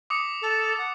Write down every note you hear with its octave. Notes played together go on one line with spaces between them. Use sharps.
D6 D#6 C#7
A4
F#5